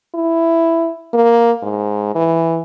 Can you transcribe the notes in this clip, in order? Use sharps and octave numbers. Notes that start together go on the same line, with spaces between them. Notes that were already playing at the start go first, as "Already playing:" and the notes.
E4
A#3
G#2
E3